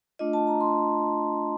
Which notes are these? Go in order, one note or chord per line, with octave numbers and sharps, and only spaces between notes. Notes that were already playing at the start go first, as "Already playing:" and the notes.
A3 D4 F4 D#5
A5
A#5
C6